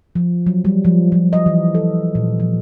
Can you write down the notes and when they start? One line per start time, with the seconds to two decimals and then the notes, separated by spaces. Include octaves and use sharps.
0.15 F3
0.47 F#3
0.65 G3
0.85 F3
1.12 F3
1.33 D#5
1.46 E3
1.75 A4
2.15 A#2
2.40 F3